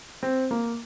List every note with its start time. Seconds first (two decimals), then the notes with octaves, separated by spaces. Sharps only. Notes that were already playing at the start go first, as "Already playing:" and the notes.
0.23 C4
0.51 A#3